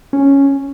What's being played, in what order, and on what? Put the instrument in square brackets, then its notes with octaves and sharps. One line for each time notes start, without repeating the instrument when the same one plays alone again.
[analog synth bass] C#4